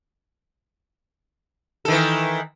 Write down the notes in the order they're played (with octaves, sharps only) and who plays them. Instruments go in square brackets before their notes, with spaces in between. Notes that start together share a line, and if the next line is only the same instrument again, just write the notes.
[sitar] A4
D#3
E3